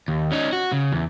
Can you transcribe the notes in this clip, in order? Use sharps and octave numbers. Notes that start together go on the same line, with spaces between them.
D#2
C#4 D#4
F#4
C#3
E2